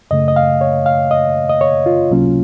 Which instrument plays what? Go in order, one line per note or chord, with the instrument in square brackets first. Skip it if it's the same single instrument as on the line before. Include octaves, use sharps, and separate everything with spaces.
[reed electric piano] F#2 C#3 A3 D#5
D#5
F5
C#5
F5
D#5
D#5
C#5
F4
C#2 C3 F#3 A#3 C#4